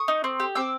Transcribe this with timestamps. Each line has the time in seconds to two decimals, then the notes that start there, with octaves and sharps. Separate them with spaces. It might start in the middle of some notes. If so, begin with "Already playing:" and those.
Already playing: C#6 D#6
0.08 D#4
0.24 C4
0.40 G4
0.55 C4 D6 E6